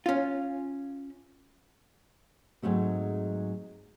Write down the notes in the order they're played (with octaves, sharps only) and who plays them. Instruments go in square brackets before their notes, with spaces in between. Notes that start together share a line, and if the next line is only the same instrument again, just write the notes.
[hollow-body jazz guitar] C#4 F4
[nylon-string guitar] G#2 F#3 G#3 A3 C4